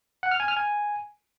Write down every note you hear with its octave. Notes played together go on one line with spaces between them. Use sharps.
F#5
F6
G#5
F6
G#5